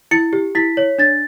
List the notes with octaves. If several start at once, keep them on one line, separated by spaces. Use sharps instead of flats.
E4 C#7
G4
E4 B6
C#5
D4 A6